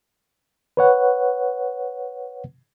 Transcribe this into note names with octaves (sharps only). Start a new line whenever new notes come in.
B4 C#5 F#5